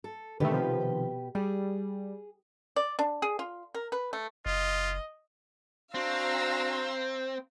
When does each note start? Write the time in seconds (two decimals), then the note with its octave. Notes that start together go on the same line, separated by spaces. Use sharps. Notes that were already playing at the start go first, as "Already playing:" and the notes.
0.04 A4
0.40 B2 D3 D#3 A3 G4 B4
0.52 C3 D#3 F3
1.35 G3 G#4
2.76 D5
2.99 D4
3.22 G#4
3.39 F4
3.74 A#4
3.92 B4
4.13 A3
4.46 F#1 F4 D#5
5.94 C4 D4 F#4 F5 A#5 C6 E6